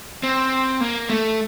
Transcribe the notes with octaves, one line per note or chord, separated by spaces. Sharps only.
C4
A#3
A3